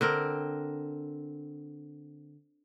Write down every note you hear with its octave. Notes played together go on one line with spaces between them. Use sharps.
D3 C4 A#4